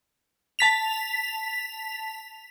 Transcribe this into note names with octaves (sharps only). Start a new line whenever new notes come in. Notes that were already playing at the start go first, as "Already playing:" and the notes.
A5 B6 F7